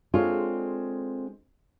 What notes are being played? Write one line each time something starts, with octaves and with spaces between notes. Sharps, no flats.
G#3 C4 D4 F4 A4 C#5